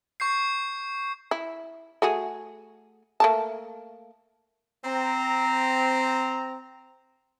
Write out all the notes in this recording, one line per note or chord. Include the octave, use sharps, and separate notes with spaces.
C#6 G6 C7
E4
A3 F#4 G#4
A3 A#3 A5
C4 A#5